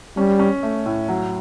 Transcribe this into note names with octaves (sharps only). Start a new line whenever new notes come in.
G3 C#4
C#4
A3
A2
F#3